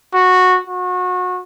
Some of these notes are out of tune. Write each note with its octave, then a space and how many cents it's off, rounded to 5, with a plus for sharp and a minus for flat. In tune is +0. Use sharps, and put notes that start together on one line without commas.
F#4 -10
F#4 -30